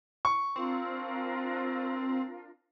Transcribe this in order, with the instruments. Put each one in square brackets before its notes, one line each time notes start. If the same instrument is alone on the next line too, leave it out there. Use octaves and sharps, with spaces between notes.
[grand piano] C#6
[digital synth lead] C4 [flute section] D4 F4 A#4